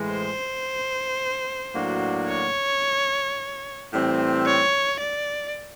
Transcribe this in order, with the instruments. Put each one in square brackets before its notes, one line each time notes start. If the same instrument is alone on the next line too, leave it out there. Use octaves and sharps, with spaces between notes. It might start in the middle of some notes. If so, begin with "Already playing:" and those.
Already playing: [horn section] A2 E3 G#3
[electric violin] C5
[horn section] A2 F#3 A#3 D4 F#4
[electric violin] C#5
[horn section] A2 E3 G3 C4
[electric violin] C#5
D5